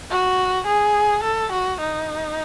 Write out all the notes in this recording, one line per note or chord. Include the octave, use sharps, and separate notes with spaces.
F#4
G#4
A4
F#4
D#4